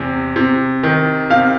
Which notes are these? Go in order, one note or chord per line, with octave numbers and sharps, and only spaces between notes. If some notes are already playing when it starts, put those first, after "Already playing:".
Already playing: E2 C3
C3
D#3
C3 F5